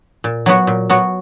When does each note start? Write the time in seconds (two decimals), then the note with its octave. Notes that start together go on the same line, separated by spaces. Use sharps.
0.24 A#2
0.46 F#3 B3 F#4
0.67 A#2
0.90 F#3 B3 F#4